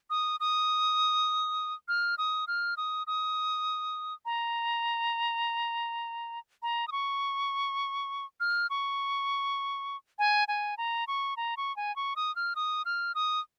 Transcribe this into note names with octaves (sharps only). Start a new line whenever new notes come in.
D#6
D#6
F6
D#6
F6
D#6
D#6
A#5
A#5
D#6
C#6
F6
C#6
G#5
G#5
A#5
C#6
A#5
C#6
G#5
C#6
D#6
F6
D#6
F6
D#6